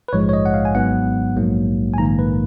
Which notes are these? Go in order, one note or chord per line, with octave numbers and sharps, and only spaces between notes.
B4
A#1 G#2 F3 G#3 C#5
C#5
D#5
F#5
F5
G#5
G#1 G#2 F#3 B3 F#5
A#1 G#2 F#3 A#3
G#5
A#1 G#2 D#3 A#3 A#5
B4